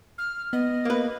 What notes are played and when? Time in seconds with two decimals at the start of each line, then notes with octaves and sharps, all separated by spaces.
0.18 F6
0.53 B3 D#5
0.85 A#3 B4